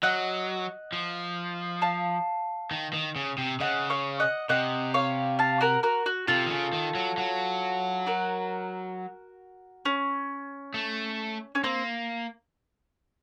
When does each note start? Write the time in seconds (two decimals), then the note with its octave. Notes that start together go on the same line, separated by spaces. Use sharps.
0.03 F#3 D#5 F#5
0.93 F3
1.82 F5 A5
2.71 D#3
2.93 D#3
3.16 C#3
3.38 C3
3.60 C#3 D#5 F#5
3.90 C#5 F5
4.20 D#5 F#5
4.49 C3 D#5 F#5
4.94 C#5 F5
5.39 F5 A5
5.61 F#4 A#4
5.83 F#4 A#4
6.06 F#4
6.28 C3 F4 A4
6.46 D#3
6.51 C#3
6.73 D#3
6.95 F#3
7.18 F#3
8.07 F#4 A#4
9.85 C#4
10.74 A3
11.55 C#4
11.64 A#3 C4